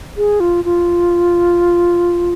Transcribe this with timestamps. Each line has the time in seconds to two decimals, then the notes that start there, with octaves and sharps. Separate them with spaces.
0.17 G#4
0.40 F4
0.64 F4